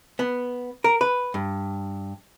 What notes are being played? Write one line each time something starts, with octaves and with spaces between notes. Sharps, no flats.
B3
A#4
B4
G2